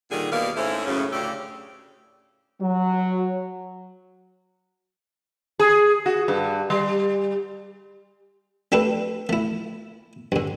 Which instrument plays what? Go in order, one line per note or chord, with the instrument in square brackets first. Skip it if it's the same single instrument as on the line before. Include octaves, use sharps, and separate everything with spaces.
[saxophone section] A#2 D3 D#3 G3 G#4
D#2 B2 D#3 A#3 D5 F5
G#2 A3 C4 C#4 E4
F#2 A2 C#3
D2 A2 C#3 D4 G4 A4
[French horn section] F#3
[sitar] G#4
F#4
G2
G3
[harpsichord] A3 D4 G4 A4 B4
A3 E4
G2 D3